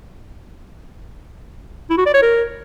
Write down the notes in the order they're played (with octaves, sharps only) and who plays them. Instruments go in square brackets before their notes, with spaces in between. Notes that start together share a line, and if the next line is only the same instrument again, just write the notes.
[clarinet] E4
F#4
D5
C#5
A#4